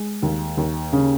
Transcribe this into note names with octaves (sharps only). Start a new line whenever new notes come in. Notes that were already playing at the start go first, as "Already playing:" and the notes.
Already playing: G#3
D#2
D#2
C#3